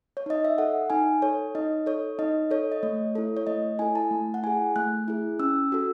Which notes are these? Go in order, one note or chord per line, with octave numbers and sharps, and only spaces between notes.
C#5
D#4 D#5
E5
A4 F#5
D#4 G#5
A4 C#5
D#4 D#5
A4 C#5
D#4 D#5
A4 C#5
D#5
A3 C#5
E4 A4
C#5
A3 D#5
E4 A4 G#5
A5
A3
F#5
E4 G#4 G#5
A3 F#6
E4 G#4
C#4 E6
F#4 A4